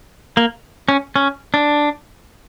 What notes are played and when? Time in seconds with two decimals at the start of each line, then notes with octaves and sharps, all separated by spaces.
0.37 A#3
0.89 C#4
1.16 C#4
1.54 D4